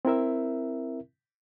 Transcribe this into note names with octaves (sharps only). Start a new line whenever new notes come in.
C4 E4 A#4 E5